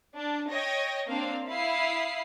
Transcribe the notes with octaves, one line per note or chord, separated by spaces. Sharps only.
D4
C#5 D#5 G5 G#6 A#6
A#3 C4 D4 F5
E4 F5 B5 D#6 C7